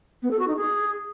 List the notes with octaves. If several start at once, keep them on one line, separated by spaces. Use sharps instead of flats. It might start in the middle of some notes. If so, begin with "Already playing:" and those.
B3
A4
F#4
D#4
G#4